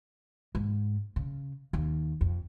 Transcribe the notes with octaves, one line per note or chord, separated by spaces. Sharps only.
G#2
C#3
D#2
F2